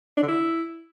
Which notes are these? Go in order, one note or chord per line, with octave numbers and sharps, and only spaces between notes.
D4
D3
E4